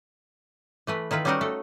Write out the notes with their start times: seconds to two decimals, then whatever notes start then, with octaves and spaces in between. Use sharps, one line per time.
0.87 E3 A3 B4
1.11 D#3 E4 F4 B4
1.25 G3 C#4 D#4 F#4 A#4 F#5
1.41 A3 A4